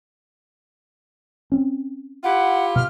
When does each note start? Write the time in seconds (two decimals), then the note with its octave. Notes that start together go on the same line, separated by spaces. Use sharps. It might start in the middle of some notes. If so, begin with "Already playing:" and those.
1.52 C4 C#4
2.23 E4 F4 G4 F#5
2.76 B2 F6